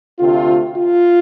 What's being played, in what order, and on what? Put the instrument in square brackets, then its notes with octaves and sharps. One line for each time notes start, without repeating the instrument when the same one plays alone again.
[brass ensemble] D2 C3 A3 C4 F4
F4